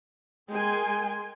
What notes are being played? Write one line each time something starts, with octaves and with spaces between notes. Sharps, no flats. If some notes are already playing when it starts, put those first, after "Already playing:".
G#3 G#4 A#4 G5 G#5 C6